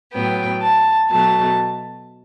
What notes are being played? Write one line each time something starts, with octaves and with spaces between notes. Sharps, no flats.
A2 F#3 B3 G5
A5
B2 F#3 A3 A5